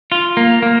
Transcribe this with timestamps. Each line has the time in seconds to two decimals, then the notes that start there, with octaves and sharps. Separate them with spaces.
0.12 F4
0.37 A#3
0.62 A#3